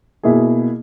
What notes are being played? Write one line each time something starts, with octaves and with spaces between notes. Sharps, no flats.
B2 A#3 E4 G#4